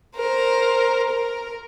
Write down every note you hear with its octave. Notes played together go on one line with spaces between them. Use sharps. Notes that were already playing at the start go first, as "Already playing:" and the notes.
A#4 C5
A#4